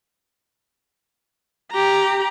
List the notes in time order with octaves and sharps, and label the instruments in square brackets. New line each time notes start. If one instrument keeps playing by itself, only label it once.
[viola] G4 A#5